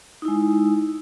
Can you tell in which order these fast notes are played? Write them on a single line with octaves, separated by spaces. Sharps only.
D#4 E4 G#3